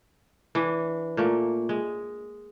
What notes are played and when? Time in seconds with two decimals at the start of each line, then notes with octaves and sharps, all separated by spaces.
0.55 E3 D4
1.17 A#2 A3 A#3
1.69 G#3